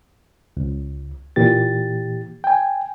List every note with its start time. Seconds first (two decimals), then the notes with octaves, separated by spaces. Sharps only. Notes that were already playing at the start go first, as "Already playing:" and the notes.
0.57 C#2
1.36 A#2 E3 G4 A6
2.44 G5 G#5